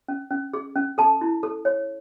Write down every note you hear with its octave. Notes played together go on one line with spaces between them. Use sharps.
C#4
C#4
G#4
C#4
A4 A5
E4
A4
C#5